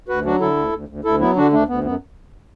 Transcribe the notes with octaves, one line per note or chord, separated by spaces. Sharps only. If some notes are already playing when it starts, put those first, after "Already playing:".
D2 F#4 B4
F#3 D4 F#4
D3 E4 A4
D2
D2
D2
D2 E4 A4
F#3 B3 E4
D3 D4 F#4
D2 A3 D4
D2 B3
F#2 B3